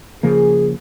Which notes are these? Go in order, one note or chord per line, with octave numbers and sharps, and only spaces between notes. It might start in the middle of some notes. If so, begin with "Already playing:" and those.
C#3 F3 A#3 G#4